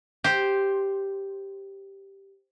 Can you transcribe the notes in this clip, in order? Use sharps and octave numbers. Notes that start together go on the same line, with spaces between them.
G4 C5